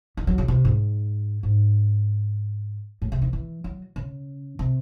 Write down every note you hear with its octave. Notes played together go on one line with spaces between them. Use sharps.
D#3
F#3
C#3
C3
G#2
G#2
A2
C3
D#3
E3
F#3
C#3
C3